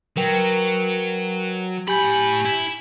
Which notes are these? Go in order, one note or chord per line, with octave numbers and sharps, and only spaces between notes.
F#3 A#4 B4 G5
A2 G4 G#5 B5 G6
E4